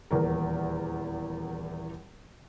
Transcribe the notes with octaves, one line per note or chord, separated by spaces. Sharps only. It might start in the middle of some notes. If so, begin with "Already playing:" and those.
D#1 E2 E3 A#4